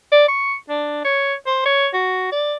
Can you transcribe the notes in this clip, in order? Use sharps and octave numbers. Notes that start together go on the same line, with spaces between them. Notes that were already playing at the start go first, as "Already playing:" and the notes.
D5
C#6
D4
C#5
C5
C#5
F#4
D5